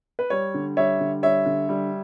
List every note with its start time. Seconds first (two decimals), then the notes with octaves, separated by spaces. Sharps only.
0.19 B4
0.30 G3 C#5
0.54 D3
0.77 G3 C#5 E5
1.00 D3
1.23 G3 C#5 E5
1.46 D3
1.69 G3